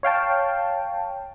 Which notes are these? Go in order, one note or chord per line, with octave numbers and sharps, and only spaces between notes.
C#5 F5 G5 A5